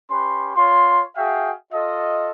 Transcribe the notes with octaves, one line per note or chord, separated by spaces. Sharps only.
C#4 G4 B4 C6
F4 C#5 C6
F#4 G#4 E5 F5 G5
F4 A4 D#5